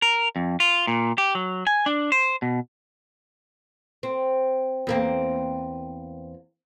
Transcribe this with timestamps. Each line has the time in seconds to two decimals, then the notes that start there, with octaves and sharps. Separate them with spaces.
0.02 A#4
0.36 F2
0.60 F4
0.87 A#2
1.18 G4
1.35 F#3
1.67 G#5
1.86 D4
2.12 C5
2.42 B2
4.03 C4
4.87 E2 A#3 C4